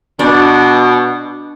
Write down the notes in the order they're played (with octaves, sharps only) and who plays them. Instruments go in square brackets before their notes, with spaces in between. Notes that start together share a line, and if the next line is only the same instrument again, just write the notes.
[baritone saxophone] B2 [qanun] D4